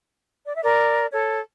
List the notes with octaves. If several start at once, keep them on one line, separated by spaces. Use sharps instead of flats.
D5
E5
A#4 D5
A4 C#5